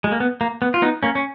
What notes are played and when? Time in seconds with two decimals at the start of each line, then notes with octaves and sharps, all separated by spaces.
0.04 G#3
0.12 A#3
0.20 B3
0.41 A#3
0.62 B3
0.74 F4
0.82 B3 D#4
1.03 A#3 C#4
1.15 C#4